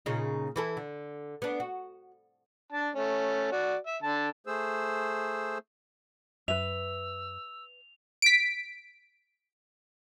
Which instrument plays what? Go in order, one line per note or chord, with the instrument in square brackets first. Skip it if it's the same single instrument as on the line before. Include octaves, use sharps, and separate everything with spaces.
[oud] A#2 C#3 D#4
E3 E4 A4
D3
B3 D4
F#4
[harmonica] D4 A5
A3 C#4
F#4 D5
E5
D3 A5
[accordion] A3 G#4 C5 E6
[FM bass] F#2 [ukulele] B4 E5 [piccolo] E6 [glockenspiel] F7
[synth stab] B6 D7